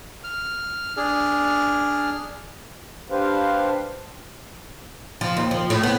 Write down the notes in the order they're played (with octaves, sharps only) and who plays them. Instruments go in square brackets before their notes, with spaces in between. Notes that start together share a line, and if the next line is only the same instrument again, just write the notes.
[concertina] F6
D4 G#4 F6
[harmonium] D4 G4 B4 C5 F5
[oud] F3
D#2
F3
A2
B3